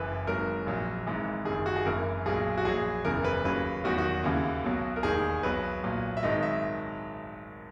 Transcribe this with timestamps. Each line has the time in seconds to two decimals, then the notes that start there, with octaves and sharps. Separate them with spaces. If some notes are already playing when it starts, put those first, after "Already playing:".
Already playing: F#1 F#2 E3 B4
0.27 G#1 G#2 F#3 A#4
0.67 A#1 A#2 F#3
1.07 G#1 G#2 E3
1.45 F#1 F#2 D#3 G#4
1.66 F#4
1.76 G#4
1.86 G#1 F#2 E3 A#4
2.26 B1 A#2 F#3 G#4
2.57 F#4
2.65 A#1 A#2 F#3 G#4
3.05 F#1 E2 C#3 E3 A#4
3.24 B4
3.45 D#2 C#3 F#3 B4
3.84 E2 D#3 F#3 F#4
3.98 F#4
4.24 D#2 C#3 E3
4.64 B1 B2 F#3
4.96 A#4
5.03 E1 D#2 D#3 G#4
5.43 B1 B2 F#3 B4
5.83 B1 A#2 F#3
6.17 E5
6.23 G#1 G#2 D#3 F#3 D#5
6.43 E5